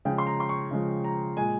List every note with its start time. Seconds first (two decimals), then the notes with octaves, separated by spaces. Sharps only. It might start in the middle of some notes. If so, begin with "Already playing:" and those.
0.05 C#3 F3 G#3 G5
0.18 C6
0.27 A#5
0.40 C6
0.49 C#6
0.71 C#3 F3 G#3
1.04 A#5
1.37 A#2 G#3 G#5